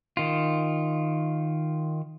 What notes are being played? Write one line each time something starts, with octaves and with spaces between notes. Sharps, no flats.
D#3 F4